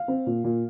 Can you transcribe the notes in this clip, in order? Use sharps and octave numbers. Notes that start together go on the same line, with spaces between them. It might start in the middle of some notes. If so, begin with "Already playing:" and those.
Already playing: F5
C4
A#2
A#2